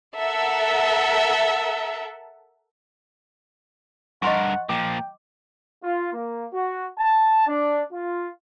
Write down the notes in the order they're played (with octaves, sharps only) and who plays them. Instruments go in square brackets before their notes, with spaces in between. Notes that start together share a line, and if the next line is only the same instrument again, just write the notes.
[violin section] A4 A#4 E5 F#5
[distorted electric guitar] G2 A#4 [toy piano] D#5 C6 C#6 [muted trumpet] F#5
[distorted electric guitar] A#2 F3 [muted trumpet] G5 [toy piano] D6
[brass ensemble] F4
A#3
F#4
A5
D4
F4